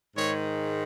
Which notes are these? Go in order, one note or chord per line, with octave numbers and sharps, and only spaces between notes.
G#2 D#3 G#3 C#5